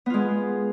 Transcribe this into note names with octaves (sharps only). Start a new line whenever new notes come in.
G#3 B3 F4